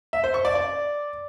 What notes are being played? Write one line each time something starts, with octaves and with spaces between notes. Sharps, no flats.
E5
C5
C#6
D5
D5